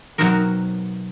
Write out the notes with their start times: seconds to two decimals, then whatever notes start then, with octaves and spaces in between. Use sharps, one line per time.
0.18 B2 F#3 C4 D#4 F#4 A#4